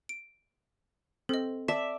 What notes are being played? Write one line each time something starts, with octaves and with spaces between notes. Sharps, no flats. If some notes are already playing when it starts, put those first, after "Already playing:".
D7
C4 A4 D#5
D5 E5 A5